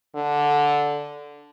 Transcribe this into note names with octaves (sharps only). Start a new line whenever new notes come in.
D3